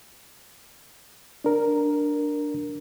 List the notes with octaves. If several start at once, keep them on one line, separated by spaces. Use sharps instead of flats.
D4 A#4